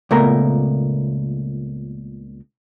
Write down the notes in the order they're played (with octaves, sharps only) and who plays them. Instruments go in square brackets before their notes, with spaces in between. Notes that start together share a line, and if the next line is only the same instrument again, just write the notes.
[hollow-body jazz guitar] C#2 A#2 A3 B3 A#4 A#5